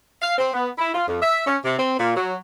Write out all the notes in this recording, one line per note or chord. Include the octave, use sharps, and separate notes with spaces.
F5
C4
B3
E4
F4
F2
E5
C#4
C3
C4
A#2
F#3